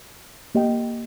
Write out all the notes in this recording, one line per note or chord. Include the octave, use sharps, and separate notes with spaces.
A#3 G4 D#5 G5